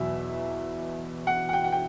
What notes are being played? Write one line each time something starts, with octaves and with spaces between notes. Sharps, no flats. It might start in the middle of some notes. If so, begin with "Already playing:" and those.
Already playing: E2 B2 F#3 E5
F#5
F#5
G5
F#5
G5